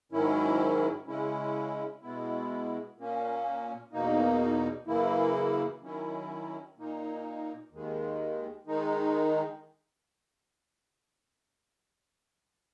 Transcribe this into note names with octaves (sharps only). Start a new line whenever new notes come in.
G#2 D#3 F#3 C#4 E4
C#3 G#3 C#4 E4
B2 G#3 B3 E4
A#2 A#3 C#4
E2 B2 A#3 D#4
F#2 C#3 E3 A#3 E4
D#3 F#3 C#4 E4
A#2 A#3 D#4
D#2 D#3 G#3
D#3 G#3 D#4